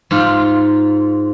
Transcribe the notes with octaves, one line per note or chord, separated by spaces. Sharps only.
G#2 F4